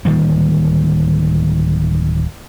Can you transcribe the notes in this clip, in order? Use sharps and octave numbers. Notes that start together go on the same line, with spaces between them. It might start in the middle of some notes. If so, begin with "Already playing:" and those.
D1 D#3 G3 A#3